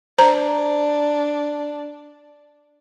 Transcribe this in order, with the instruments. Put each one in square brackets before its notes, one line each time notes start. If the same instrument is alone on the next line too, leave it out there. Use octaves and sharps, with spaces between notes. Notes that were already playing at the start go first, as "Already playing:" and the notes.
[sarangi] D4 [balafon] C5 A#5